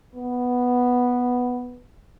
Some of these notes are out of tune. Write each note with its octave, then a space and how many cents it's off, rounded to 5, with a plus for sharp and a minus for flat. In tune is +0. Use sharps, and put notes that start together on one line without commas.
B3 +0